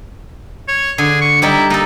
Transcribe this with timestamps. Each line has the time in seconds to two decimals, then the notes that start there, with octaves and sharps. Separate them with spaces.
0.68 C#5
0.98 D3 G#4
1.21 C#6
1.42 G3 D#4 E4 G4
1.70 A#3 D#4 A4